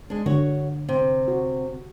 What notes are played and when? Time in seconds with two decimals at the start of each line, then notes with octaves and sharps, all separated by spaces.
0.10 G#3 D4
0.26 D3 F#4 C#5
0.89 C3
1.28 F#4